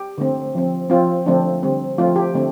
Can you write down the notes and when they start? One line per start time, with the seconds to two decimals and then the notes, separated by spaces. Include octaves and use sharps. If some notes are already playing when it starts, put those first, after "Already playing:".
Already playing: G4
0.18 D3 A3 C4
0.55 F3 C4
0.90 F3 C4 F4
1.26 D3 F3 A3 C4 D4
1.63 D3 G3 C4
1.98 F3 A3 C4 F4
2.16 G4
2.35 D3 A3 C4